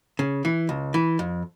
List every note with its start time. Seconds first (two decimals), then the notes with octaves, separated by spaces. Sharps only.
0.19 C#3
0.45 E3
0.69 C#2
0.94 E3
1.19 F2